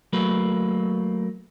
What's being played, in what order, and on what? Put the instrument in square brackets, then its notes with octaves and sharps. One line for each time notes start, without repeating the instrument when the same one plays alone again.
[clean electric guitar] F#3 A3 A#3 B4